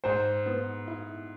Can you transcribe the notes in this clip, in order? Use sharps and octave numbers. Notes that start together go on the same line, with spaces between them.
G#2 C5
B3
E4